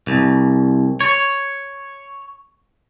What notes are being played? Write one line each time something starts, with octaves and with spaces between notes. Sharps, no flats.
C2
C#5